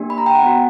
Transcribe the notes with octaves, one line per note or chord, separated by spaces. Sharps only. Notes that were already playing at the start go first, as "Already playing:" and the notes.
Already playing: A#3 D4 G4
B5
A#5
G5
F#5
B3 F#4